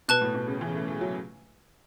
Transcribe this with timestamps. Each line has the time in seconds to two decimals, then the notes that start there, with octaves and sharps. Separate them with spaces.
0.08 B2 B4 A5 F#6
0.21 A2
0.35 B2
0.48 C#3
0.61 E3
0.75 A3
0.88 A3
1.01 F#3